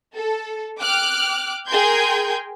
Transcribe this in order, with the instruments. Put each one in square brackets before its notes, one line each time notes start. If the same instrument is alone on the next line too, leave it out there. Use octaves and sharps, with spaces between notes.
[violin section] A4
G5 D6 F6 F#6
G#4 A#4 G5 C6 G6 G#6